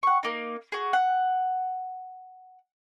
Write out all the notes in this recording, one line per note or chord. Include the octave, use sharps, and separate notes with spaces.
F#5 C#6
A#3 D#4
F#4 G#4
F#5